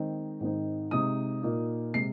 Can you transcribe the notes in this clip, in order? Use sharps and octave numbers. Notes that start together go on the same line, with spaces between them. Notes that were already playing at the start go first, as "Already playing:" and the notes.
Already playing: D#3 G#3 C4 D#4
G#2 D#3 C4 D#4
C3 G#3 D#4 D#6
A#2 A#3 D#4
C3 G#3 C7